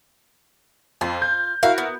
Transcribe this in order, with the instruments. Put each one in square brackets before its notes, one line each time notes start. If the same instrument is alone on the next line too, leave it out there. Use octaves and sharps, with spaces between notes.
[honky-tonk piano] F2 [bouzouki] F4
[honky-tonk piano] G6
[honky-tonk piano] E4 F#4 A#4 [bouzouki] F5
[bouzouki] B3